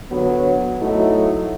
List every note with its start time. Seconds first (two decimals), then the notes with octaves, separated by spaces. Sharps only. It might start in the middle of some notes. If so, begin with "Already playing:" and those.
0.10 D3 F#3 B3
0.80 F#3 A3 D#4 E4